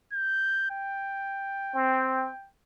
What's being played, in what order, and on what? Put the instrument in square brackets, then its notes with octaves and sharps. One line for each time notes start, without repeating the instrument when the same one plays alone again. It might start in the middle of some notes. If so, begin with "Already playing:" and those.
[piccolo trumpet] G6
G5
[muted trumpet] C4